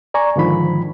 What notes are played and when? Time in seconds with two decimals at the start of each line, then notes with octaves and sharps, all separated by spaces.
0.14 D5 G#5 A#5 C#6
0.36 G#2 D3 D#3 F3 B5